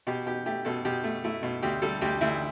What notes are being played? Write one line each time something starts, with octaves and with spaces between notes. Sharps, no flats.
B2 G4
B2 G4
A3 G4
B2 A4
B2 G4
A3
A3 E4
B2
D2 G4
G3 A4
D2 G4
D2 E4